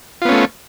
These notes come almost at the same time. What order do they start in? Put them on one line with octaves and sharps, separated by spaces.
F4 B3 C#4 A3